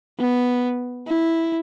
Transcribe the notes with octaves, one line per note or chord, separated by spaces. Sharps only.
B3
E4